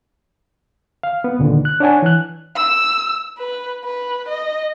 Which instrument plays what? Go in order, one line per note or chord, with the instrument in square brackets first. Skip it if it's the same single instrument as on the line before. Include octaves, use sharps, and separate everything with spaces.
[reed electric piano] F5
B3
C#2 A#2 D3 D#3
F#6
D4 C#5 F#5 G#5 A5
E3 F#6
[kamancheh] E6
B4
B4
D#5